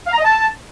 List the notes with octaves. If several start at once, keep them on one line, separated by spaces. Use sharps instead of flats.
F5
A#5
D#5
A5